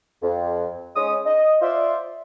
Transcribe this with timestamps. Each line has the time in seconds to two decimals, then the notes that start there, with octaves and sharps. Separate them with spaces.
0.23 F2
0.96 G#3 C#4 D#6
1.26 D#5
1.61 F4 C5 D5 E5